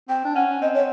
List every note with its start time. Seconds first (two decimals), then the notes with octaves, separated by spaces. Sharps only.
0.09 C4 G5
0.25 D4
0.35 C#4 F#5
0.62 C4 D#5
0.75 C#5